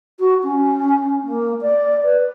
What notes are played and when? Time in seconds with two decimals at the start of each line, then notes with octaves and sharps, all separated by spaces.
0.19 F#4
0.43 C#4
1.24 A#3
1.61 D5
2.03 B4